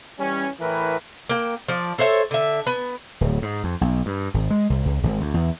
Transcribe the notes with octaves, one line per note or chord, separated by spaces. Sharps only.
E3 G3 C#4
A2 E3 E4 A#4 B4
A#3 G5
F3 D5
A4 C5 C#5 E5
D3 E5
B3
D1
G#2
F2
B1
G2
G#1
G#3
C2
C#2
G#1
D2
E2